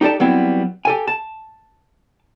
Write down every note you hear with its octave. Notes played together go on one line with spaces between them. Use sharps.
D#4 G4 A4 D5 A5
F#3 G3 B3 C4 E4
G4 A4 G#5
A5